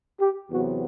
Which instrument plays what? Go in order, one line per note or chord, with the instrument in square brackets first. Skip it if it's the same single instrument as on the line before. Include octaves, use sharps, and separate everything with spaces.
[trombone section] G4
E2 C3 F#3 B3 F#4